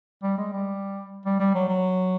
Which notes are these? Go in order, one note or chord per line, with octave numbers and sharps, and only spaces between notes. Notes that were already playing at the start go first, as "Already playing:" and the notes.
G3
G#3
G3
G3
G3
F#3
F#3